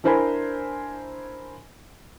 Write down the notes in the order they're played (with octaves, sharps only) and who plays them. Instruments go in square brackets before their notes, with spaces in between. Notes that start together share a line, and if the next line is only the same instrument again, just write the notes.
[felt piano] D4 E4 A#4 C5 G#5 B5